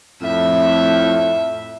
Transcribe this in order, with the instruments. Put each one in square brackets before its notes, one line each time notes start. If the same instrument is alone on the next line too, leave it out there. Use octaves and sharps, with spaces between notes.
[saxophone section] F2 A2 [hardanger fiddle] E5